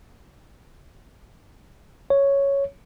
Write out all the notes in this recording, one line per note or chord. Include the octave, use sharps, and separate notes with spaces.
C#5